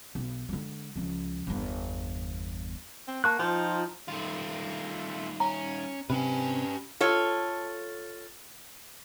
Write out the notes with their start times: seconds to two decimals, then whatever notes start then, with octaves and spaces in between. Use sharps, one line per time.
0.15 B1
0.49 D3 G#3
0.96 C#2 F3
1.47 G1 E2
3.08 C4
3.24 A#3 A5 C#6 F#6
3.39 F3 D#4 F4 G5
4.08 D#3 G3 A3 F4
5.40 C#4 A#5
6.10 C3 C#4 G4 B4 G#5
7.00 F4 A4 C#5